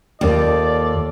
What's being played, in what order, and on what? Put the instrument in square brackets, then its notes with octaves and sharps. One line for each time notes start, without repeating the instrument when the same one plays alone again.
[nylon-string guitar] D#2 [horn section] F4 A4 D5